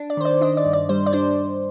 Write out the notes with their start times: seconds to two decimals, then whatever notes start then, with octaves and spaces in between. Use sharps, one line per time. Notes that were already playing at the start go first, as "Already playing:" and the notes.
Already playing: D4
0.10 D5
0.17 D#3 C5
0.25 D5
0.41 D4 D#5
0.57 D5
0.65 G2
0.73 D5
0.89 G3 C5
1.06 D5
1.13 D4 C5